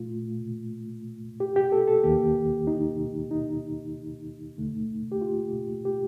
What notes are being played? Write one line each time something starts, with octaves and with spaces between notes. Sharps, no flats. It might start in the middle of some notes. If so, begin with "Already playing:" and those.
Already playing: A#2 A3 F4
G4
G4
A4
A4
D#2 D#3 A#3 G4
D#4
D#4
D#2 D3 A3
G4
F4
G4